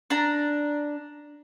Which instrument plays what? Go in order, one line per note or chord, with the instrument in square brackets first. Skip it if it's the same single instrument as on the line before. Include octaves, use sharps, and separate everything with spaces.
[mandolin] D4 A#5